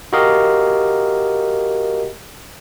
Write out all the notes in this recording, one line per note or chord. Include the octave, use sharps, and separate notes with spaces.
F#4 G4 A#4 D#5 F5